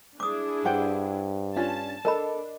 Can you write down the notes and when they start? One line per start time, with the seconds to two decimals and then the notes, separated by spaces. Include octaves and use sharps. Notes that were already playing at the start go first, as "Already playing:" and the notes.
0.20 D4 E4 G#4 D6 D#6
0.65 G2 C5 F#5 G5
1.56 C#4 D4 F4 A5
2.05 D4 A4 A#4 D#5 B5